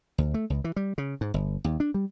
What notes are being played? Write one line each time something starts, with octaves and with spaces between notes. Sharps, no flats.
D2
A3
C#2
E3
G3
C#3
G#2
G1
D#2
D4
G3